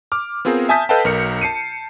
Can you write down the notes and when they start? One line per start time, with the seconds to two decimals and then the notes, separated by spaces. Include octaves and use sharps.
0.12 D6 F6
0.45 B3 C4 F4 G#4 A#4 C5
0.69 E5 G#5 A5 D#6 G6 B6
0.89 A4 B4 D#5 F5 G5 A5
1.05 B1 A#4 C#7
1.41 A5 C7 C#7 D#7